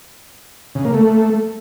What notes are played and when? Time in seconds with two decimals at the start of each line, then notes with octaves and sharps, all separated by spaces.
0.75 C#3
0.85 A#3
0.94 A3